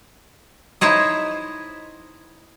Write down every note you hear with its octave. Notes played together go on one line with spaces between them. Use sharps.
D#4 E4 C5 C#5 D#5